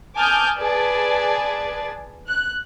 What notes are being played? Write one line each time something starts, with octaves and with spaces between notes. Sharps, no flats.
G#5 A5 D6 D#6 F6 G6
G#4 B4 D5 A5
F#6